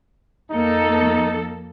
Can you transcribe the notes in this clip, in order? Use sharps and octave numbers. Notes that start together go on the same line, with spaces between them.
F2 A#3 D#4 A4